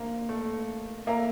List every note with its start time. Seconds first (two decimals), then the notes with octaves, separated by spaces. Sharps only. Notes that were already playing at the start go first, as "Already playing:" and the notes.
Already playing: A#3 C4 D4 G4
0.29 A3
1.06 A#3 A4 E5 A#5